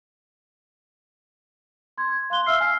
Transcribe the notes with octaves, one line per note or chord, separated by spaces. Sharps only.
C6 G#6
F5 C6 F#6 G7
E5 F5 E6 F6 C7
G#5 F6 C7